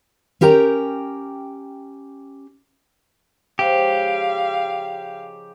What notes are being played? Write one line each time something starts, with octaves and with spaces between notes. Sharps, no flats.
C#4 G4 A#4 G5 A#5
C#3 F3 G#3 G4 F5